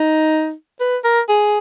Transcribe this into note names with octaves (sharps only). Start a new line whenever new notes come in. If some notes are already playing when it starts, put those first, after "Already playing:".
Already playing: D#4
B4
A#4
G#4